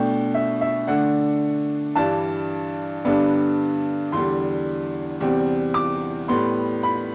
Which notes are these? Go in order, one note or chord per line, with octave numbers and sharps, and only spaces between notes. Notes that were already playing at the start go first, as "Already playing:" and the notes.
Already playing: B2 A3 D4 G5
E5
E5
D3 A3 D4 F#5
G2 E3 G3 D4 A5
G2 D3 G3 B3 D4
E2 D3 G3 C6
E2 C3 G3 C4
D6
A2 G3 B3 C6
B5